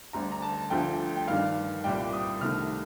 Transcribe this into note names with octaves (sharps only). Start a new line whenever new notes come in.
D2 D3 G3 A#5
A#5
A5
D2 D3 F3 A3 G5
G5
G2 D#3 G3 F5
C2 A#2 G3 G5
D#6
C2 C3 D#3 A3 F6